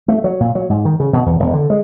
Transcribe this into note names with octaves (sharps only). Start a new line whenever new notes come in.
A3
F#3
A#2
F#3
G#2
D#3
C#3
B2
E2
E1
D3
G#3